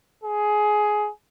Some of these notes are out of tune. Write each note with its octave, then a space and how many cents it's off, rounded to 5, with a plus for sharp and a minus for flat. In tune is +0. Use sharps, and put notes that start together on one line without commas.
G#4 +15